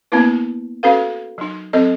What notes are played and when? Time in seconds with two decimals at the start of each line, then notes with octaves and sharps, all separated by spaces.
0.12 A#3 B3 C#4 E4 B4
0.83 C#4 F#4 A4 B4 F5
1.38 F#3 D#4
1.73 F#3 C4 A4 D#5